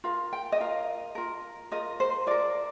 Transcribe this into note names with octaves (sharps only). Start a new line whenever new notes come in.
F4 A#4 F5
G5
D#5
F4 A#4 F5
F4 A#4
F4 A#4 D#5
C5
F4 A#4 D5